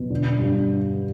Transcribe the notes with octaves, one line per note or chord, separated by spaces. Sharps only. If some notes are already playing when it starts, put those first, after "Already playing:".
Already playing: B2 F#3
D3
G2